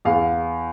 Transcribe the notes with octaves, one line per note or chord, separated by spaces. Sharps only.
E2 F5